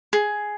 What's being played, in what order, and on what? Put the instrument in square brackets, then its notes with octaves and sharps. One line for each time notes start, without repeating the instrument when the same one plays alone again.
[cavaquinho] G#4